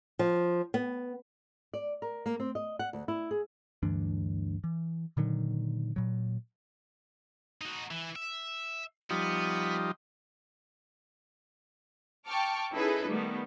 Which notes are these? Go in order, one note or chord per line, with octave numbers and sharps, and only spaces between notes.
F3
B3
D5
A#4
A#3
C4
D#5
F#5
D2
E4
G#4
D2 G2 E3 D4
E3
A#2 D3 D#3 F#3
A#2 F#3
D#4 F#4
E3
E5
F3 G3 B3 D#4
G5 A5 C#6 D6 F6
C#4 D#4 E4 G#4 A4 B4
D#3 G3 A3 B3